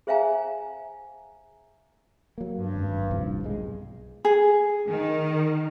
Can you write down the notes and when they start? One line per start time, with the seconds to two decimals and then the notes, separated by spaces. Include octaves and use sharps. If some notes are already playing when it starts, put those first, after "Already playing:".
0.07 G#4 C5 E5 F5 G#5 A#5
2.38 F#3 A#3
2.57 G2
2.75 G#1 F#2
3.11 D#1 C2 F3
3.44 B1 G#3
4.25 G#4
4.88 D#3